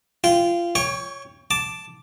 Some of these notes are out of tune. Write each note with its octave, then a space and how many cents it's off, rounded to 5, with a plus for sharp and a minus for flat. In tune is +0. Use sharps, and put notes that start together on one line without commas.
F4 -20 G5 -10
C#5 +0 G5 +30 C#6 +35
A5 +0 D6 +0